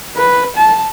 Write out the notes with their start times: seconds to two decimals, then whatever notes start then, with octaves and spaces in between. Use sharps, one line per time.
0.16 B4
0.56 A5